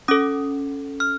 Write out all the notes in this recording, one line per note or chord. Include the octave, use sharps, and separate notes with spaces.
C#4 A4 D#6
F6